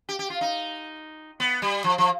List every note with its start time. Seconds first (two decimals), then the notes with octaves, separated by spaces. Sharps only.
0.09 G4
0.19 G4
0.30 F4
0.41 D#4
1.40 B3
1.62 G3
1.84 F3
1.98 F3